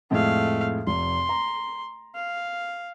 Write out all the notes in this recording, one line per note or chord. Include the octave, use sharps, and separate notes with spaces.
F2 A2 G#3 A3 F5
F1 C6
A#5
F5